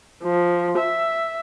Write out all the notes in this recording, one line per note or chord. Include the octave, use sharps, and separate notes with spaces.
F3
E5